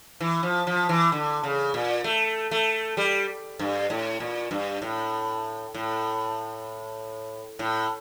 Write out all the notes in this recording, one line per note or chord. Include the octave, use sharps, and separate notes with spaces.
E3
F3
F3
E3
D3
C#3
A#2
A3
A3
G3
G2
A2
A#2
G2
A2
A2
A2